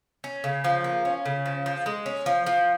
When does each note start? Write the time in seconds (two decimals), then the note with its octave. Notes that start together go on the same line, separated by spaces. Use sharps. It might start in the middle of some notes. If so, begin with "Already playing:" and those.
0.24 C#4
0.44 C#3
0.64 F3
0.84 A#3
1.05 C#4
1.25 C#3
1.46 F3
1.66 F3
1.86 G#3
2.06 C#4
2.26 F3
2.46 F3